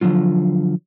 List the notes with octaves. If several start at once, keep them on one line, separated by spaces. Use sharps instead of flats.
D3 F3 F#3 F4